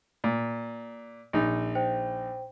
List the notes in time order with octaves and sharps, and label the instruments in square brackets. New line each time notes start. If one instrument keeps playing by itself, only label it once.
[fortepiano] A#2
A#1 D#4
[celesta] C5 G5